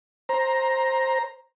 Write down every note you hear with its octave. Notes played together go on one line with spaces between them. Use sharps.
C5 A#5